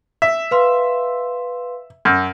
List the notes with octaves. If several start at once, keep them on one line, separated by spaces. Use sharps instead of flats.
E5
B4 F5 C6
F#2